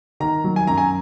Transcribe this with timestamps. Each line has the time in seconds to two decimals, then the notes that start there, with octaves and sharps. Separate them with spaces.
0.20 D#3 A#5
0.44 F#3
0.56 G#5
0.67 F#2 A#5
0.78 G#5